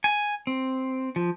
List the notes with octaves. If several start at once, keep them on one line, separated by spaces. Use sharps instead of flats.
G#5
C4
F3